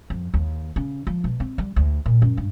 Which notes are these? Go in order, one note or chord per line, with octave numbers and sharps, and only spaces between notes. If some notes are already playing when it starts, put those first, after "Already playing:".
F2
D#2
C#3
F3
B2
C4
G3
D2
A#2
F#2
G2